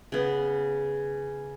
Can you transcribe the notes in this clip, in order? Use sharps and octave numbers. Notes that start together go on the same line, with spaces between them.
C#3 B3